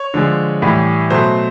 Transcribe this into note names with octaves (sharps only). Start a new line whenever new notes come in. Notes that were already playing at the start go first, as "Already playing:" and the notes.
Already playing: C#5
D3 F3 G#3
A2 E3 G3
B2 F#3 A3 C5